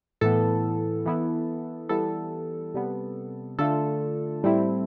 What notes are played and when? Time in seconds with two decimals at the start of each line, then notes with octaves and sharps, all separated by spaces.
0.21 A2 E3 B3 A4
1.06 E3 B3 E4
1.89 E3 G3 B3 A4
2.74 C3 G3 B3
3.58 D3 A3 D4 F4 A4
4.43 A2 G3 C4 E4